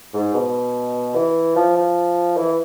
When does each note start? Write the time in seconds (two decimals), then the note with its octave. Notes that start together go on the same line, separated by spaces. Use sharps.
0.13 G#2
0.33 B2
1.15 E3
1.56 F3
1.76 F3
2.37 E3